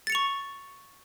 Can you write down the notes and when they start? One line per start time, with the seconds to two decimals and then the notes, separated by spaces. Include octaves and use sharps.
0.07 A6
0.10 C#7
0.12 F7
0.15 C#6